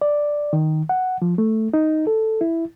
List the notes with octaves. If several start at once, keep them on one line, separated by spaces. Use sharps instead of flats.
D5
D#3
F#5
F3
A3
D#4
A4
E4